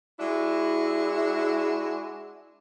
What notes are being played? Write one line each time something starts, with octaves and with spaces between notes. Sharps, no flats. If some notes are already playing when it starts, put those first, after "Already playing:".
G#3 D4 E4 F#4